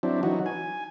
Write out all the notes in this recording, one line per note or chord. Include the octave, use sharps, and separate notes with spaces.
F#3 C4 D4 E4
E3 F#3 D#4 F#4
G#5